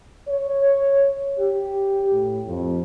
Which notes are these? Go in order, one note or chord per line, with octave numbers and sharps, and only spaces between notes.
C#5
G4
A2
F2